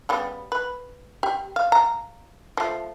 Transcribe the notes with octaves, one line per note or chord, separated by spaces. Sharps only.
C#3 G3 B3
B4
G4
F5
A#5
F3 A3